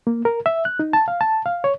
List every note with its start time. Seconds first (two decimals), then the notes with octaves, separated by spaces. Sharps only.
0.07 A#3
0.25 A#4
0.46 E5
0.65 F#6
0.79 D#4
0.93 A5
1.08 F5
1.21 A5
1.46 F5
1.64 C#5